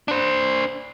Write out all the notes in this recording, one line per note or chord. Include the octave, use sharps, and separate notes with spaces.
D4 C5